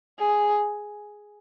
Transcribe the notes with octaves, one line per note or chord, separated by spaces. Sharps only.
G#4